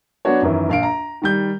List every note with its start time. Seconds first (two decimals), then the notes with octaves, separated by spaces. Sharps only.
0.25 F#3 B3 D4 F#4 C#5
0.42 F#2 D#3 E3
0.69 A#1 F5 D7
0.83 A#5
1.22 D#3 G3 G6